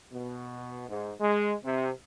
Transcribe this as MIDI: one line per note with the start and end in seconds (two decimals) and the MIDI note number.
0.12 0.85 47
0.89 1.13 44
1.20 1.55 56
1.65 1.90 48